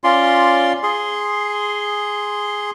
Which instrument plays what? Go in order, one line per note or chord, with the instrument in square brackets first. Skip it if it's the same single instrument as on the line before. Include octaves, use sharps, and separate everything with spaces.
[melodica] C#4 F4 D5 C6
G#4 C6